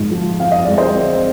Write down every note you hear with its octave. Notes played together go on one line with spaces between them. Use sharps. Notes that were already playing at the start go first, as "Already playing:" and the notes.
Already playing: G#2 F3 G#3
F3
C4 F5
D#5
G#3 D5
C5 D#5
C4